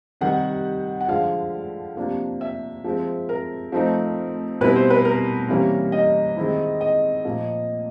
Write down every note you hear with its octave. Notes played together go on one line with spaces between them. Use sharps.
C3 D#3 G3 F#5
F#5
D3 F3 G#3 F5
C3 F3 A#3 D4
E5
F3 G#3 C4
A#4
F3 A3 C4 D#4
B2 G3 C4 E4 B4
C5
B4
A#4
C3 E3 G3 A#3 C#4
D#5
D#3 G#3 C4 E4
D#5
A#2 F3 A#3